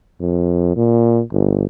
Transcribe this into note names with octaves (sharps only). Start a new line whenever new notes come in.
F2
A#2
G1